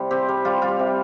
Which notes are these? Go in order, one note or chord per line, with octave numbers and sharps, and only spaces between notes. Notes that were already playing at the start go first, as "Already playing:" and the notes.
Already playing: C3 G3
C4 G4
G3
G3 F4
G3 F4
C3